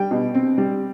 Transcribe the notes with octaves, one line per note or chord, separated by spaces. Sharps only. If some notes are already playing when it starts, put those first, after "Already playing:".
Already playing: G3 G5
B2
C4
G3